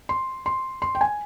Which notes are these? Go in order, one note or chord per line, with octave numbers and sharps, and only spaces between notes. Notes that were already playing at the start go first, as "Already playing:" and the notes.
C6
C6
C6
G5
G#5